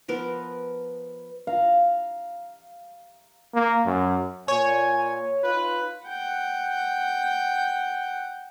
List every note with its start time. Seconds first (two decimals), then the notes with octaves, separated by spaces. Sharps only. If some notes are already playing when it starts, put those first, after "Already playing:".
0.08 F3 B3 A#4
1.47 F5 A#5
3.55 A#3
3.86 F#2
4.48 A#2 C#5 G#5
5.44 D#4 F4 B4
6.07 F#5 G5